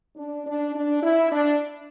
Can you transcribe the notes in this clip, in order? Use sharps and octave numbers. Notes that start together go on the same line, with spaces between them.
D4
D4
D4
E4
D4